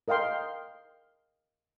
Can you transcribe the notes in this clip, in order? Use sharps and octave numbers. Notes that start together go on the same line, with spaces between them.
A#4 D#5 F5 G5 C6